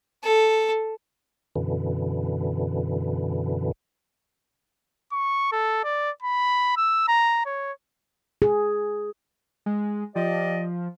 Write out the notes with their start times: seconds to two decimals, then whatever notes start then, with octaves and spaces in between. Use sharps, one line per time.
0.24 A4
1.56 F#2 B2 D3 E3
5.12 C#6
5.52 A4
5.84 D5
6.22 B5
6.77 E6
7.08 A#5
7.46 C#5
8.42 G#4
9.66 G#3
10.16 F3 G4 D5 D#5